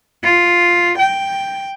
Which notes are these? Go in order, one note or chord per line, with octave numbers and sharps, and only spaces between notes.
F4
G5